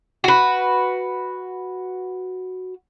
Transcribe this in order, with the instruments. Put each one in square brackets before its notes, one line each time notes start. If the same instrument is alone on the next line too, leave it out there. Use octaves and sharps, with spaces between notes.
[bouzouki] F#4 B4